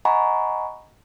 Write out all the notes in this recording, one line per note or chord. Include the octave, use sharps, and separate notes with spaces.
D#5 F#5 G#5 A#5 B5 C#6